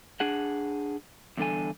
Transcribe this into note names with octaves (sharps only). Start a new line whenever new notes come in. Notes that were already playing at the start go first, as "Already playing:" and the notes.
D4 G#4 F#5
E2 G2 D3 A4 G#5